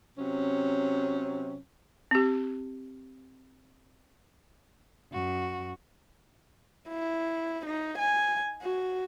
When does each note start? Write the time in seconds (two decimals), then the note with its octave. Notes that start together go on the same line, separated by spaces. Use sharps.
0.18 C3 F#3 C#4
2.11 C4 G4
5.12 F#2 F#4
6.88 E4
7.66 D#4
7.98 G#5
8.62 F#4